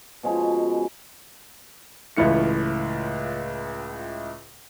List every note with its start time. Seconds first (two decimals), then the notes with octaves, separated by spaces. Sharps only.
0.23 B2 F3 G#3 C#4
2.17 C#2 A2 E3 F4 C#7